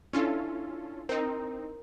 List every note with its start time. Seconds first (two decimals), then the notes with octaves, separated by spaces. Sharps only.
0.13 C#4 D4 E4 F4 A4
1.09 C4 D#4 A#4